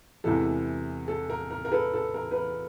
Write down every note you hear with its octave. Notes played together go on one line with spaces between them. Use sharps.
E2 C3 E3 G#3 A4
A4
A#4
A#4
A#4
A4 B4
A4
A#4
B4
A#4